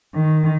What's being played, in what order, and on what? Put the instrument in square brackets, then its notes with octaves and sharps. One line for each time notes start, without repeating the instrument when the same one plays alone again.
[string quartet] D#3